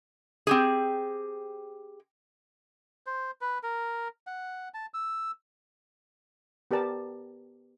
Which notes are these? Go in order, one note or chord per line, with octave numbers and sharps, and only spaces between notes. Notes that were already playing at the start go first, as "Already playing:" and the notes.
C4 G4 G#4
C5
B4
A#4
F#5
A5
E6
B3 G4 A#4 D5 A5